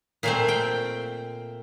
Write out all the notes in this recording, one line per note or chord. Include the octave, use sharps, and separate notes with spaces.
A#2 A3 C4 F5
G5